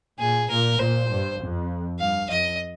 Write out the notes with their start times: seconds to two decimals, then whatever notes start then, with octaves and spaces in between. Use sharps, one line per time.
0.19 A#2 G#4
0.49 A#2 A#4
0.79 A#2 C5
1.10 G2
1.40 F2
1.99 G2 F5
2.30 F2 D#5